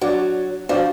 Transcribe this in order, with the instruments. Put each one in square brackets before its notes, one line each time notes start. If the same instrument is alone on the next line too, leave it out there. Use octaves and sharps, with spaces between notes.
[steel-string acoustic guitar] F#3 [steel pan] D4 F#4 D5 F#5
[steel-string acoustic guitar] F3 [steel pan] D4 F#4 D5